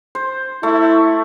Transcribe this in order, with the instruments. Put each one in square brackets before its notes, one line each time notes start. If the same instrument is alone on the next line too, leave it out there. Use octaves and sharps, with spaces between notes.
[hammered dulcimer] C5
[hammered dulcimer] A3 [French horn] E4